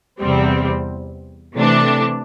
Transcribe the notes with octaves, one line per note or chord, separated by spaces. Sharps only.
E2 C3 G3 C4
C3 E3 A3 D4